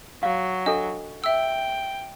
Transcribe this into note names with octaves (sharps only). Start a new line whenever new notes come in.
F#3 F5
D4 A4 D#5
E5 G5 E6